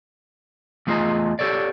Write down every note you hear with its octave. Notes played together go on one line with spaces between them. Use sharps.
E2 A3 F4 G#4 D#5 A#5
G4 A4 C#5 D5